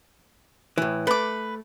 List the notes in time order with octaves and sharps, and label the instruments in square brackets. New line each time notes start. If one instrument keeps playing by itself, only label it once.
[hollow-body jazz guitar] A2 E3
[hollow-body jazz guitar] A3 [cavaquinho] B4 D6